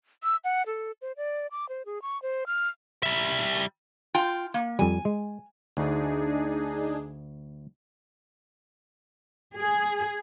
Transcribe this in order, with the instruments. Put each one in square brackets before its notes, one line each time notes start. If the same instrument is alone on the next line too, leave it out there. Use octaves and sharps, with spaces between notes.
[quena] E6
F#5
A4
C5
D5
D6
C5
G#4
C#6
C5
F6
[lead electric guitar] G3 E5
[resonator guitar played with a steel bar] F4 G5
A#3
[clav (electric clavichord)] F2 G3 [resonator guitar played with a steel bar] G#5
[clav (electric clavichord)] G#3
[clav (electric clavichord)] D2 [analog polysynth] D4 D#4 G#4
[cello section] G#4